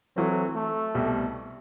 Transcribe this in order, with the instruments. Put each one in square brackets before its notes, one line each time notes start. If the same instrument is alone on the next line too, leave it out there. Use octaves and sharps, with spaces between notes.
[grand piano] E3 A3 C4 [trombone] F#3
[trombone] A3
[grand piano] C2 B2 G3